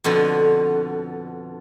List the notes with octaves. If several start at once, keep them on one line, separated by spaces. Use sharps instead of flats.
F2 B2 D3